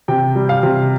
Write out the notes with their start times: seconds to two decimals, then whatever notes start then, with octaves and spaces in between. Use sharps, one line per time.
0.08 C3 G5
0.35 G3
0.49 F5
0.63 C3